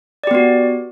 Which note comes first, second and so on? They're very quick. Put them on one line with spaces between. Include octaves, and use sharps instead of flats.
D5 G4 B3 F#4